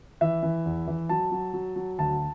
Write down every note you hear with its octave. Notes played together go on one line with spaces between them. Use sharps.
E3 E5
E3
E2
E3
F#3 A5
F#3
F#3
F#3
D2 A5